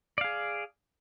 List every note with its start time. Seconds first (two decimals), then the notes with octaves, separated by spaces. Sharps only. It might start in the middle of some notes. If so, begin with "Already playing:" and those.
0.18 D5
0.21 F5
0.24 G#4